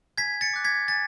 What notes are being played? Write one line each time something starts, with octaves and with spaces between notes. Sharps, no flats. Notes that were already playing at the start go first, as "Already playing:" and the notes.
G#5 G#6 B6
A6 C#7
D6 F#6
G#6 B6
G#5 A6